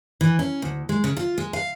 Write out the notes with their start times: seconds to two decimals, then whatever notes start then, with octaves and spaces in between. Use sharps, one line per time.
0.21 E3
0.39 C#4
0.62 D2
0.89 G#3
1.04 C#3
1.17 F4
1.38 G#3
1.53 F5